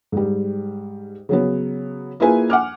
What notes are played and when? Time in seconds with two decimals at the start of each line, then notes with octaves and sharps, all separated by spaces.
0.12 G#2 G3
1.29 C#3 F#3 B3
2.20 A#3 E4 F4 G#4 B4 G#5
2.50 F#5 G#5 D6 F6